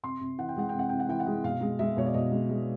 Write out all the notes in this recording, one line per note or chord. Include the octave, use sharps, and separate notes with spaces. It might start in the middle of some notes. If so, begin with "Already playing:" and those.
C3 C6
C3
E3 F#5
G5
G#3 F#5
C3 G5
F#5
C3 G5
F#5
E3 G5
F#5
G#3
B2 F5
G#3
G#3 E5
B2 C#5
D5
B2 D#5
G#3
G#3